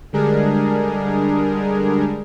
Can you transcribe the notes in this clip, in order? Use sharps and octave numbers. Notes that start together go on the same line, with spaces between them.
D3 G3 G#3 D4 G#4 A#4